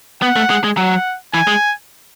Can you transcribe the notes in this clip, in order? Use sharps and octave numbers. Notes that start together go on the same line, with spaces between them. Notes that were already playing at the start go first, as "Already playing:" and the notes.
B3 F#5
A3
G#3
G#3
F#3 F#5
E3 G#5
G#3